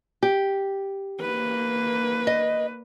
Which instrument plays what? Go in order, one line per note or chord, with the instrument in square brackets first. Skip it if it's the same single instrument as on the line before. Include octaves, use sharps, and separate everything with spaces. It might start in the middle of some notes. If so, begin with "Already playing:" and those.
[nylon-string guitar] G4
[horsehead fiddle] A#3 B4
[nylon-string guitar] D#5